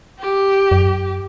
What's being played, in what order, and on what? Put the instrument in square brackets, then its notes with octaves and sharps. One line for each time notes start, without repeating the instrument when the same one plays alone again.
[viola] G4
[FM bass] F#2